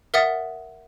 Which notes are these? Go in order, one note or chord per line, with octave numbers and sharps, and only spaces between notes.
A#4 E5 F#5 D#6 A6